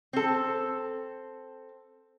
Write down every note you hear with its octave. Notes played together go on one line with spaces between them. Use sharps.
C4 A4